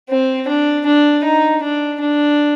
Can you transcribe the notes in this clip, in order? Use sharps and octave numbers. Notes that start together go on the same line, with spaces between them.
C4
D4
D4
D#4
D4
D4